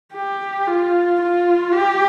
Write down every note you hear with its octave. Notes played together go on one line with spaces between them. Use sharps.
G4
F4
F4
G4